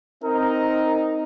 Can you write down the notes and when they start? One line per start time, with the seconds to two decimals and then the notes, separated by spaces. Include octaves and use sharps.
0.23 C4 D#4 A#4